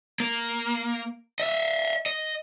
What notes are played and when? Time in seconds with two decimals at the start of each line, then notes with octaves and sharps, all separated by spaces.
0.20 A#3
1.40 D#5 E5
2.06 D#5